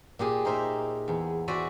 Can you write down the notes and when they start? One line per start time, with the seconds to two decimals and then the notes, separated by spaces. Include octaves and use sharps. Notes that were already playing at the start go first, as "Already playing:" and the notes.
0.19 A#2 G4 G#4
0.45 D#4 A#4 C5 E5
1.08 E2
1.48 F#4 C5 D5 E5 G#5